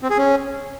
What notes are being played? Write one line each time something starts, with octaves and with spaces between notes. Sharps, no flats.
C4
G#4
C#4